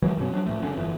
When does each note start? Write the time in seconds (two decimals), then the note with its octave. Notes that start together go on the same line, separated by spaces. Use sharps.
0.02 D#3 E3 F#3 G#3
0.17 F#2 B2 C#4
0.32 F3 F#3 D4
0.46 A2 F3 A3
0.61 F#1 D3 C#4
0.76 G1 F2 E3